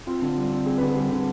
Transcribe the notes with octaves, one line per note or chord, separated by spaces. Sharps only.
C4 F4
D3
G3
C4
C4 G#4
D3 B4
G#4
G3
D3